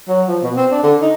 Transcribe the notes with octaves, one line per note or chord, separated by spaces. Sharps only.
F#3
F3
B2
C4
D4
D3
D#4